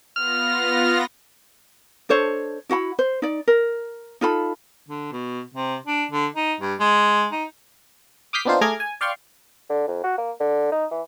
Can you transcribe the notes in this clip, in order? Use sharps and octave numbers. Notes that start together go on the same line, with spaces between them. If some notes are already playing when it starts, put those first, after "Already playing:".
B3 F4 F6 A#6
D4 A4 C5 C#5
E4 F#4 F#5 B5
C5
D#4 D5
A#4
D#4 F4 A4 B5
D3
B2
C3
D4
D3
D#4
G2
G#3
D#4
D6 D#6 F6 G6 B6 C7
B3 C4 D4 D#4 F4 C5
A3 G#4 A#5 D6 F6 G#6
G#5
D5 F5 G5 C6 C#6
D3
F2
F#4
A#3
D3
D#4
E3